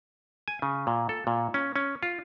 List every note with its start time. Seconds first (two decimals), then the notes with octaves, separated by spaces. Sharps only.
0.48 G#5
0.62 C#3
0.87 A#2
1.09 A4
1.27 A#2
1.54 C#4
1.76 C#4
2.03 F4